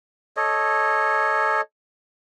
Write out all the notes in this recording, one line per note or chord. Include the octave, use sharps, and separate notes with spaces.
A4 C#5 D#5